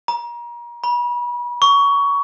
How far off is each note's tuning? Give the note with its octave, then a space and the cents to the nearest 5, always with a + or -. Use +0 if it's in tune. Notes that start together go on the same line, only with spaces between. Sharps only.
A#5 +35
B5 -35
C#6 +20